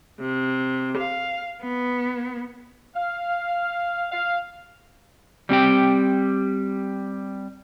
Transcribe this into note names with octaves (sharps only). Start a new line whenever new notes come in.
C3
F5
B3
F5
F5
G3 C4 G4 G5